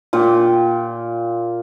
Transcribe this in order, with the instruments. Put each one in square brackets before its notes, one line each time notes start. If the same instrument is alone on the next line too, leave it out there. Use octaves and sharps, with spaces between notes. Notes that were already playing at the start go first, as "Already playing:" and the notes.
[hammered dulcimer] A#2 F4 G5